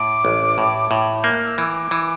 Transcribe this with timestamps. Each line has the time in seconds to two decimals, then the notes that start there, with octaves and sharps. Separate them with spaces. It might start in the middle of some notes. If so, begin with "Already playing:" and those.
Already playing: A2 D6
0.25 A1
0.58 A2
0.91 A2
1.23 A#3 G6
1.35 F6
1.46 E6
1.58 E3 D6 E6
1.91 E3